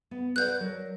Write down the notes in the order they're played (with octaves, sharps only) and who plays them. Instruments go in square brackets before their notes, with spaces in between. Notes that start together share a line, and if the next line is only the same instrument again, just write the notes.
[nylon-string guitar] B3
[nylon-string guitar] B4 D5 F#5 [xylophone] F#6 G6
[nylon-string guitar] F#3 A#4